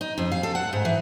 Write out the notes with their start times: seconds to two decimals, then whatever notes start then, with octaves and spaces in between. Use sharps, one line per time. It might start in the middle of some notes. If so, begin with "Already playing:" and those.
0.01 D#4
0.18 F2
0.32 F5
0.43 A4
0.55 F#5
0.73 G#2
0.85 E3